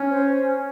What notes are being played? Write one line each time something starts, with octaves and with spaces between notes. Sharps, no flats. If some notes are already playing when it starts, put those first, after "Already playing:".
Already playing: C#4
C5